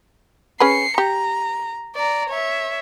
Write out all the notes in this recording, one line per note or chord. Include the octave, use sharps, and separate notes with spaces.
C#4 G#4 B4 C7 C#7
G4 A#5
D5 A#5
C#5 E5